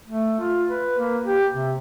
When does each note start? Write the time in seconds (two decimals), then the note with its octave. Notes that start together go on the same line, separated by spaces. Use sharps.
0.07 A3
0.40 F4
0.69 B4
0.98 A#3
1.25 G4
1.53 C3